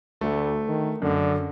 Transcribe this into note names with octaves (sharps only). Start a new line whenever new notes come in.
D2 A3
D#3
F#2 D3